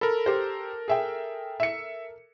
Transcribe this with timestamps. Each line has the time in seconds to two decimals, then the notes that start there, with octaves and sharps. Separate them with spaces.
0.01 A4 A#4 B5
0.26 G4 C5
0.88 G#4 E5 G5
1.60 E5 C#7